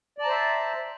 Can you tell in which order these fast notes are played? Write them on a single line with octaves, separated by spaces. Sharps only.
D5 A5 A#5 C5 E5